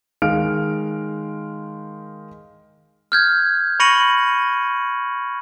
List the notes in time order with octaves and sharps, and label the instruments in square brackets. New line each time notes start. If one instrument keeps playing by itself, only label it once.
[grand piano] D#3 G#3 F5 F6 D7
[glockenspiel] F6 G6 G#6
B5 C#6 A#6 C#7 D#7 F#7